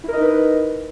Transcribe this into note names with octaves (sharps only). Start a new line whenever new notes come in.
D#4 E4 A#4 B4 D#5